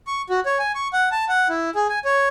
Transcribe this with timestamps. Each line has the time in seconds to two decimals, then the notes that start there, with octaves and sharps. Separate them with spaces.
0.07 C#6
0.29 F#4
0.46 C#5
0.59 G#5
0.75 C#6
0.93 F#5
1.11 A5
1.29 F#5
1.49 E4
1.75 G#4
1.88 G#5
2.05 C#5